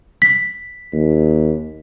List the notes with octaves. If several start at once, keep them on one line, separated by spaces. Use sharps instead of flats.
B6
D#2